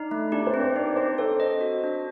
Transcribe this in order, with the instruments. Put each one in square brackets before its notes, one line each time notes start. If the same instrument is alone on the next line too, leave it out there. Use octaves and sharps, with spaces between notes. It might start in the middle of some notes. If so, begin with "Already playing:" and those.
Already playing: [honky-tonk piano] D4 [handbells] D#4
[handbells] A3
[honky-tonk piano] D4 [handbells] G4
[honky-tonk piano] C5
[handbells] C4
[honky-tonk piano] C5
[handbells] D#4 [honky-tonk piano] D5
[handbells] C4 [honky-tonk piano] C5
[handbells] A4 [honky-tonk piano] C5
[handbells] D#5
F#4
D4